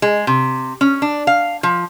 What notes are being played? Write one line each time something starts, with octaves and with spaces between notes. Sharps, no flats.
G#3
C3
C#4
D4
F5
F3